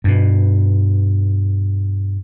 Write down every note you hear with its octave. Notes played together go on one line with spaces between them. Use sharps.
G2 B2